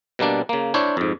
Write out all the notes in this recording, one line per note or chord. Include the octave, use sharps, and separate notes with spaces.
B2 G3 A#3 D4
C#3 A#3
D4 E4 C5 C#5
F2 G#2